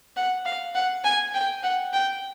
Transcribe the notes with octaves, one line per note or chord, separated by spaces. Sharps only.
F#5
F5
F#5
G#5
G5
F#5
G5